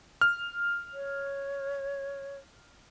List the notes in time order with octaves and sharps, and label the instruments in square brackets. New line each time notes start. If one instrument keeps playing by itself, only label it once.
[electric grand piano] F6
[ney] C#5